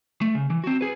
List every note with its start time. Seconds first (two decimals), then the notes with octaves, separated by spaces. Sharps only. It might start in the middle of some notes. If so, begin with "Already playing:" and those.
0.21 A3
0.35 C#3
0.50 E3
0.64 C4 F#4
0.81 G#4 B4